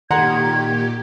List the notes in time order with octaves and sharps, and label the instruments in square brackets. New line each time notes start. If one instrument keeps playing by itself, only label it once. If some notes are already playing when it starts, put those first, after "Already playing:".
[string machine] A#2 G4 [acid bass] D#3 [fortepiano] F#5 A#5 C6 [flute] G#6